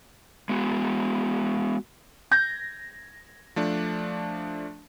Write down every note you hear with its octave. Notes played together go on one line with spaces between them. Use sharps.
G#3 B3 F#4
G6 G#6 A#6
F3 A3 D4